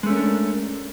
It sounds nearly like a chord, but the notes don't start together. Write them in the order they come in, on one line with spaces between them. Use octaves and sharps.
G#3 A3 C#4 A#4 D4